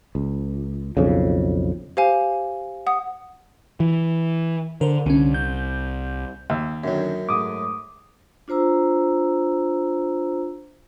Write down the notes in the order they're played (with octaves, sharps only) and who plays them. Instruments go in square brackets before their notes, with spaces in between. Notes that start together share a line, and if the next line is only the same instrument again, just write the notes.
[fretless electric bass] C#2
B1 F2 C#3
[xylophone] G4 C5 F5 G#5
F#5 D#6
[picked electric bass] E3
[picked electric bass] D3 [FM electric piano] A#4 C5
[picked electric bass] C2 [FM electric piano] D3 C#4
[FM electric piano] G6
[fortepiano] D#2 [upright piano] E6
[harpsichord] F#2 F#3 [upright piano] D3 D#3 C#4
[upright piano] G#2 A3 [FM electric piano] D6 D#6
[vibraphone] D4 F4 C5 A#5 E6